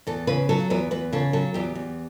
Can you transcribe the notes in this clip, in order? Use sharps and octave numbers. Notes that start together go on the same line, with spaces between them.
E2 A4
C#3 B4
F#3 A4
E2 B4
E2 B4
C#3 A4
F#3 A4
E2 G4
E2